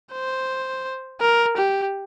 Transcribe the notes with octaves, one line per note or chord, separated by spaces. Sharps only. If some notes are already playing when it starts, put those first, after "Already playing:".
C5
A#4
G4